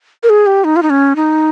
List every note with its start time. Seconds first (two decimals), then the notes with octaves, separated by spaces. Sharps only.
0.23 A#4
0.29 G#4
0.46 G4
0.64 D#4
0.76 F4
0.83 D#4
0.90 C#4
1.16 D#4